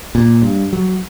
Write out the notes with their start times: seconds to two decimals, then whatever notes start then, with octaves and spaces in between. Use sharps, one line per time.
0.15 A#2
0.42 G2
0.73 F#3